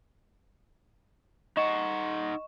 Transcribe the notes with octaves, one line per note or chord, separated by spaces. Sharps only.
D#4 D#5 F#5 C#6 E7